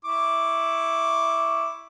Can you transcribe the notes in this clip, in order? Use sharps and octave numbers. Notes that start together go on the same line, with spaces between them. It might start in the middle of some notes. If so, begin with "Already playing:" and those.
E4 C#6 D6